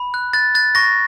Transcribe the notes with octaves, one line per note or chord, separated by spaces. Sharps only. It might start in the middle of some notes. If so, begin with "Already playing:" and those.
Already playing: B5
F#6
F#6 A6
F#6 A6
C#6 A#6